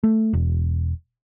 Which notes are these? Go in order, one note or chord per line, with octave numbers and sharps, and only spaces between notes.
A3
E1